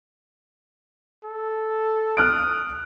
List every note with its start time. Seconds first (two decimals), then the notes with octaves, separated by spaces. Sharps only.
1.24 A4
2.17 D#6 F6 F#6 D7